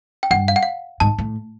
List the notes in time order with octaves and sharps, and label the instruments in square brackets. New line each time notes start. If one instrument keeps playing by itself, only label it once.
[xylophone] G5
[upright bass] G2 [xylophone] F#5
[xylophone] F5
F#5
F5
[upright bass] G#2 [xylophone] A5
[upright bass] A2